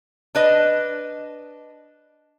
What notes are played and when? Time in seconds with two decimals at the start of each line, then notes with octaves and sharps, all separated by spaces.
0.35 D4 B4 D#5